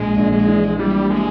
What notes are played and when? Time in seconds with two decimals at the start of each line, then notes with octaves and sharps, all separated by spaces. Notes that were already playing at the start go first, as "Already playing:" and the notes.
Already playing: A#1 G#3
0.17 A#1
0.32 G#3
0.48 E3
0.78 E3 G3
1.09 G#3 A3